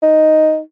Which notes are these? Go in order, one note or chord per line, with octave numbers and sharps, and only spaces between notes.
D#4